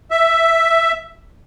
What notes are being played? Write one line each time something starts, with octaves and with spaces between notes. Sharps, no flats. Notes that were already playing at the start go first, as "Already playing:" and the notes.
E5